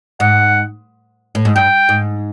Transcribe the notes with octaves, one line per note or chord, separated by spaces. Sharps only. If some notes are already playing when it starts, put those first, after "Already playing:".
G#2 F#5
A2
G#2
G2 G5
G#2